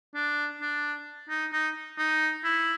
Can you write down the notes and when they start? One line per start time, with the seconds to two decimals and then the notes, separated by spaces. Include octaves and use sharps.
0.15 D4
0.61 D4
1.29 D#4
1.53 D#4
1.98 D#4
2.44 E4